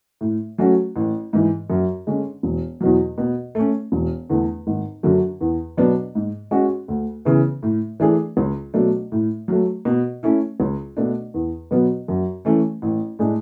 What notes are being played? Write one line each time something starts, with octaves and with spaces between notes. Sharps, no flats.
A2
F#3 A3 C#4 F#4
A1
G#2 E3
F#2
D3 G#3 C#4
E1
E2 B2 F#3
B2
A3 C#4
E1
E2 D3 A3
G#1
F#2 D3 F#3
E2
B2 F#3 B3 D4
G#2
G#3 C#4 F#4
D2
C#3 E3 B3 E4
A2
E3 A3 D4 G#4
C#2
B2 F#3 A3 D4
A2
F#3 A3
B2
A3 C#4 E4
C#2
B2 A3 D4
E2
B2 F#3 B3
F#2
E3 A3 C#4
A1
A2 G#3 D4 G#4